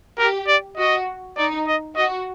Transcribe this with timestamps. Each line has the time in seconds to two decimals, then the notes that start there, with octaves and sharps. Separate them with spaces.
0.18 G4 A#4
0.48 D5
0.77 F#4 D#5
1.37 D#4 D5
1.67 D#5
1.96 F#4 D#5